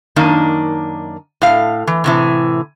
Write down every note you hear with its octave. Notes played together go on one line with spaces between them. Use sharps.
F#2 D#3 A#3 D4 D#4
A2 F5
E3
A2 C3 E3